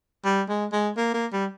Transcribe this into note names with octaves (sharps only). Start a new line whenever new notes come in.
G3
G#3
G#3
A#3
A#3
G3